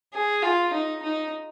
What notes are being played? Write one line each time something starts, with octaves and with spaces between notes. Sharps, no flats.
G#4
F4
D#4
D#4